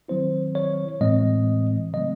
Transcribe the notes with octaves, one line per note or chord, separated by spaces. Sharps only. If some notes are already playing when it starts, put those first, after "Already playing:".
D#3 F#3 C4 E4 C5
C#5
A2 E3 G#3 C4 D#5
C#3 F#3 A3 C4 D#5